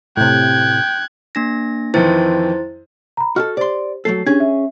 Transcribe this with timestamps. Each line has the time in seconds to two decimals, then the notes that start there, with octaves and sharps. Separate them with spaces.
0.17 A2 C3 G5 F#6 G#6
1.35 A#3 D4 A#6
1.94 F2 D#3 E3 E4 C5 A6
3.17 A#5 B5
3.36 F#4 G4 A4 D#5 F6
3.57 G4 C5 D5 C6
4.05 F#3 A3 A4 C7
4.26 C#4 D4 G4 G#4 G#6
4.40 E5